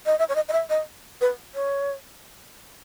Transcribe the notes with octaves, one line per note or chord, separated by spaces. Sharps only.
D#5
E5
C#5
D#5
D#5
E5
D#5
B4
C#5